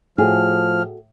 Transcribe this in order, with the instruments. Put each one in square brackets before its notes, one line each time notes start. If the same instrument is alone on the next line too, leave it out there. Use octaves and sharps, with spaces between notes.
[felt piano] A2 [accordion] F3 F6 [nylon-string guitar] F#4 G#4 A4